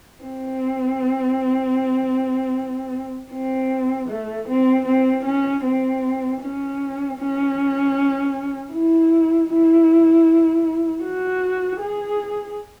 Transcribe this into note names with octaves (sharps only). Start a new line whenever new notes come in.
C4
C4
A3
C4
C4
C#4
C4
C#4
C#4
E4
E4
F#4
G#4